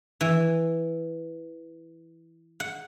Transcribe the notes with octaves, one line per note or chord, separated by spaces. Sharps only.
E3
F#5